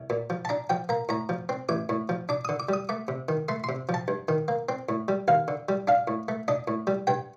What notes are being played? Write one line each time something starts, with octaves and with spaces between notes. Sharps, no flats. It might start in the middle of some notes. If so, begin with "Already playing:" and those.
Already playing: C2
A#2
F3
A5
D4 A#5
F3 G5
A#3 A#5
A2 A#5
F3
C4
A1 D6
A2
F3
D4 D6
D3 D#6
D6
G3 D#6
A3 D6
C3
D#3
A3 C6
C3 C6
F3
A5
G2
D#3
A#3
C4
A2
G3
D#2 F5
D3
G3
D4 F5
A2
A3
D4 D#5
A2
G3
G2 G5